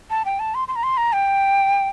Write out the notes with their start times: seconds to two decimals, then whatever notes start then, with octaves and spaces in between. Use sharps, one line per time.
0.10 A5
0.25 G5
0.39 A5
0.55 C6
0.68 C6
0.76 A#5
0.83 C6
0.97 A#5
1.13 G5